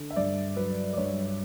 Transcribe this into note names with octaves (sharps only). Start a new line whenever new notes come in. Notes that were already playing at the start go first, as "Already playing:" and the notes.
Already playing: D3
E5
G2 D5
F#3 B4
D5
G2 C#5